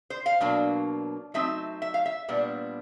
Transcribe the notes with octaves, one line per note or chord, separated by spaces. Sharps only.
C5
F5
B2 F#3 A#3 D4
F#3 A3 C4 D#4 E5
E5
F5
E5
A#2 G3 B3 D4